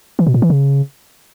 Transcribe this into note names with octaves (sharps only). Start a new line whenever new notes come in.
E3
B2
A#2
E3
C#3